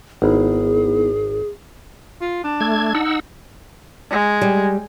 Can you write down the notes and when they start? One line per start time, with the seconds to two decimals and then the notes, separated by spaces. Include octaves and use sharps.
0.22 G#1 B3 D#4 E4 G#4
2.21 F4
2.44 D4
2.61 A3 G#6
2.94 D#4 F#5 E6
4.11 G#3
4.42 G3